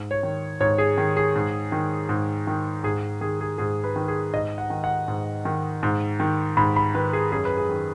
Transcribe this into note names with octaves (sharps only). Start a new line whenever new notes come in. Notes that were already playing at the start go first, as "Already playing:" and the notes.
Already playing: G#2
C#5
D#3
G#2 C#5
G#4
D#3
G#4
G#2
D#3
G#2
D#3
G#2 G#4
D#3 G#4
G#4
G#2 G#4
B4
D#3
G#4
G#2 D#5
F#5
D#3
F#5
G#2
D#3
G#2
D#3
G#2 B5
B5
D#3 B4
G#4
F#2 G#4
B4
G#4
D#3